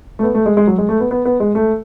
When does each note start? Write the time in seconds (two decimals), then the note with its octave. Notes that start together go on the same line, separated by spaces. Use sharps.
0.19 A3
0.23 B3
0.35 A3
0.46 G#3
0.57 G#3
0.67 F#3
0.78 G#3
0.89 A3
1.00 B3
1.11 B3
1.25 B3
1.40 G#3
1.55 A3